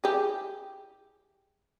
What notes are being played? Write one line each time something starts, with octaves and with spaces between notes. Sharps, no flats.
E4 G4 G#4